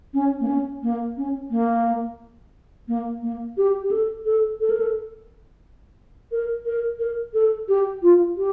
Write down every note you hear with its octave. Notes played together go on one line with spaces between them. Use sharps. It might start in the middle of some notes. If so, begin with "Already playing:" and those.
C#4
A#3
C#4
A#3
C#4
A#3
A#3
A#3
G4
G4
A4
A4
A4
A#4
A4
A#4
A#4
A#4
A4
G4
F4
G4